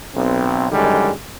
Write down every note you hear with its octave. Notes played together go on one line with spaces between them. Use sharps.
B1 C4
F#2 D3 D#3 G3 G#3